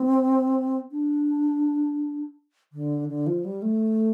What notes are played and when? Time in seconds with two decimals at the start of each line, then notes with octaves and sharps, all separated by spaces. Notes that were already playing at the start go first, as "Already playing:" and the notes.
Already playing: C4
0.92 D4
2.73 D3
3.09 D3
3.27 F3
3.45 G3
3.62 A3